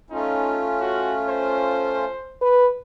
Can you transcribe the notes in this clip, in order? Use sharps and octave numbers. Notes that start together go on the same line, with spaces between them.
A3 C#4 D#4 F4
F#4
C5
B4